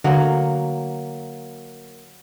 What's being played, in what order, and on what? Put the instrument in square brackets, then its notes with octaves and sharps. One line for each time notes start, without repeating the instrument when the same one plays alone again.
[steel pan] D3 [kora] F#3 A#3